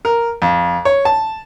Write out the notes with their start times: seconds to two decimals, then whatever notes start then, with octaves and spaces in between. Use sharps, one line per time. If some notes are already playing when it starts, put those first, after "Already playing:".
0.05 A#4
0.42 F2
0.85 C#5
1.05 A5